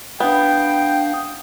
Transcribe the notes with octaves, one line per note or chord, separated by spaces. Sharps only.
B3 D4 F5 G5 D#6